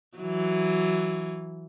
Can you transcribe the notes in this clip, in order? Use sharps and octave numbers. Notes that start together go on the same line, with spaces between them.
E3 F#3